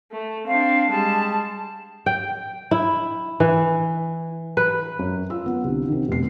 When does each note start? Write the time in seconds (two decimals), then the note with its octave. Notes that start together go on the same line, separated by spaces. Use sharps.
0.11 A3
0.47 C4 D4 F5
0.91 G3 G#3 A5
2.06 G5
2.71 E4
3.40 E3
4.57 B4
4.99 F#2
5.30 F4 E6
5.46 B3
5.64 C2 D3
5.88 C3 D#3
6.08 F1 B2 C7